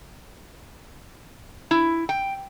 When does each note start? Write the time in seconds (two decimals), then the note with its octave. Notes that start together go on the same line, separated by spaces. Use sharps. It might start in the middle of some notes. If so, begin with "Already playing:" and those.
1.71 E4
2.09 G5